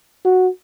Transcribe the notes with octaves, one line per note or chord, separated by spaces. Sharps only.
F#4